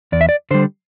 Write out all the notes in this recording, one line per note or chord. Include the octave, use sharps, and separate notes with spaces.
E2 D5
E5
D5
D3 G3 C5